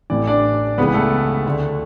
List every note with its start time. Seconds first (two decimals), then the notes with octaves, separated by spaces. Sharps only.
0.10 A1 A2 E3 D5
0.27 D4 D5
0.78 C#2 C#3 E3 B3 B4
0.94 A3 A4
1.46 D2 D3